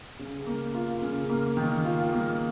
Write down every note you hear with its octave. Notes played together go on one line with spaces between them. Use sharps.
C#3
A#3
F4
C#3
A#3
D#3
F4
A#3